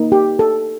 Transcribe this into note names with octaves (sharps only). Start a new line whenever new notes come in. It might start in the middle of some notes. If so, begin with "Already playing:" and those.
Already playing: A#3 D#4
G4
A4